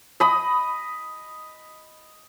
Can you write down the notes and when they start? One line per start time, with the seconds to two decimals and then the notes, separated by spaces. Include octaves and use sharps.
0.20 D#5 B5 D#6